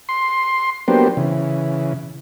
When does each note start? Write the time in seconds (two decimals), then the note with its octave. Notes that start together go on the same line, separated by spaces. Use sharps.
0.09 C6
0.88 F#3 A#3 B3 D4 G4 C5
1.17 C#3 E3